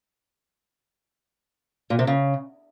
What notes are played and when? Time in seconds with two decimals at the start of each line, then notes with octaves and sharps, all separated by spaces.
1.90 A#2
1.99 C3
2.07 C#3